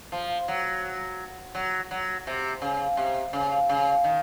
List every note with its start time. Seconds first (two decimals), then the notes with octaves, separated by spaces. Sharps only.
0.12 F3
0.48 F#3
1.55 F#3
1.91 F#3
2.27 C3
2.62 C#3
2.97 C3
3.33 C#3
3.69 C#3
4.04 D#3